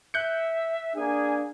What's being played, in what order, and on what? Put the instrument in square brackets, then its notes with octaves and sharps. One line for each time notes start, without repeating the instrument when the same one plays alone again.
[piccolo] E5 [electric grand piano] F#6 G6 C#7
[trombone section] A#3 G#4 [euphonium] D4 [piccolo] G#5